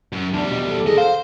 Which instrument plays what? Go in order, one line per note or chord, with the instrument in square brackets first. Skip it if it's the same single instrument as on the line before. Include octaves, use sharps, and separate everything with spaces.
[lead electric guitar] F#2
[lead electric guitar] E2 G3 [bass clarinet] D4
[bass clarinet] B2
A4
[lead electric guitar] D#2 D#5 [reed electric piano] G#4
[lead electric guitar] C5 [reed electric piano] F5